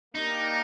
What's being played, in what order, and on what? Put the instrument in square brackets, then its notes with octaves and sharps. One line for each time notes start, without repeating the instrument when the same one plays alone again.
[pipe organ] A#3 D4 G4 A#4 [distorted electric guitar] D#4